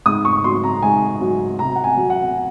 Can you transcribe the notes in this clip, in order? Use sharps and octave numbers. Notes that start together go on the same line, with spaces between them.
G#2 D#6
C#6
F#3 C6
A#5
G#2 G#5
F#3
C3 A#5
F#5
G#5
F#3
F#5